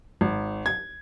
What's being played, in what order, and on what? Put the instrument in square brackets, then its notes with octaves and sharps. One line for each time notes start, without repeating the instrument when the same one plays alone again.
[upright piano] G#1
G#6